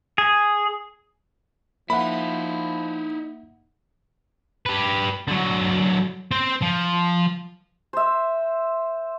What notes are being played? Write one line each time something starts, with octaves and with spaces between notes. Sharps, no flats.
G#4
F3 A#3 D#4 E4 E5 F#5 B5
G4 B4
D3 F#3
C4 C5
F3
C5 E5